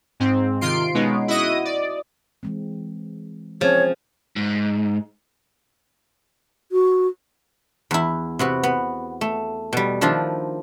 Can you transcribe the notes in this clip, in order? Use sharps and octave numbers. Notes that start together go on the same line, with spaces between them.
G#2 C4
C3 D#3 F4 C6 C7 D7
B2 G#3 B3 C#4 D#4
E4 F#4 D#5 D#6
D5
E3 G#3 C4
F3 C4 C#4 G#4 C#5
G#2
F#4
E2 E4
C3 B3 F#4
B3
A3
B2 G3
D#3 F3 D4 E4 F4